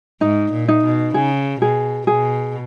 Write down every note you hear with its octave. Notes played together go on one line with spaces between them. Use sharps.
G#2 D#4
A#2
D#4
B2
C#3 G#4
B2 G#4
B2 G#4